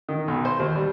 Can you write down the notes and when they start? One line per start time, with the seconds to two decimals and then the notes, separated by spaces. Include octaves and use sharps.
0.09 D#3
0.28 B1
0.45 C5
0.59 D#2
0.75 G3